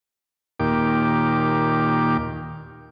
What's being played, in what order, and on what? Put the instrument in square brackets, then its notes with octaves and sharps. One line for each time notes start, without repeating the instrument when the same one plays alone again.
[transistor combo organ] D#2 A#2 G4 D6